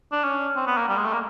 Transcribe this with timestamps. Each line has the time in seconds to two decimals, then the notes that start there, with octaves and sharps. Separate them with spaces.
0.12 D4
0.24 C#4
0.56 C4
0.67 B3
0.78 A#3
0.89 G3
0.97 G#3
1.05 A3
1.13 A#3